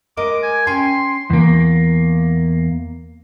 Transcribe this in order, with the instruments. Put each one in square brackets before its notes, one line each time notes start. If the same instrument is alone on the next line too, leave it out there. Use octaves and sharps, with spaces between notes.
[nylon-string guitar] G#3 A#4 D#5 [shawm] D6
[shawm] G#5
[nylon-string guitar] C#4 G5 G#5 [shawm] C6
[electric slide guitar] E2 A#3